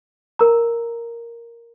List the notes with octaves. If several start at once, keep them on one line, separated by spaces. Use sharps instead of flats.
A#4 A#5